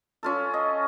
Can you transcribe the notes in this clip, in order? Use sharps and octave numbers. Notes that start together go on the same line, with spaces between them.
C#4 F4 A4
D#5